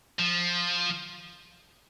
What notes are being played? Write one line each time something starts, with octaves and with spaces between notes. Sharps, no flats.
F3